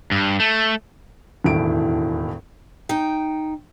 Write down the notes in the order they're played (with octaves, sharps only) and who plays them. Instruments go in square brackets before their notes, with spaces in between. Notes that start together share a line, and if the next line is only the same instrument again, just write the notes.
[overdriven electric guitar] G2
A3
[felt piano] E1 D#2 A2 E4 D7
[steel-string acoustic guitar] D#4 G5